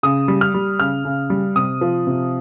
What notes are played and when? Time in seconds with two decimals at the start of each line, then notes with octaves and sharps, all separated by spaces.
0.03 C#3 D#6
0.28 G3
0.41 F6
0.54 G3
0.80 C#3 F6
1.05 C#3
1.30 G3
1.56 C3 D#6
1.81 F3
2.07 C3